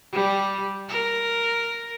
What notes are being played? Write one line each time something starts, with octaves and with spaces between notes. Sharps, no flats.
G3
A#4